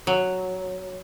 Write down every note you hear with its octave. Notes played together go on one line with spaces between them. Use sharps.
F#3